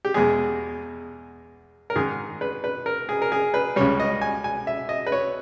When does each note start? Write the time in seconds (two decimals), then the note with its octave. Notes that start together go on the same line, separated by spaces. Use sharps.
0.05 G4
0.14 E2 B2 G#3 G#4
1.90 A#4
1.96 G#2 D#3 G#3 G#4
2.41 B4
2.64 B4
2.86 A#4
3.09 G#4
3.22 A#4
3.32 G#4
3.54 B4
3.76 C#2 C#3 G3 C#5
4.00 D#5
4.21 G#5
4.44 G#5
4.67 E5
4.89 D#5
5.06 B4
5.12 C#5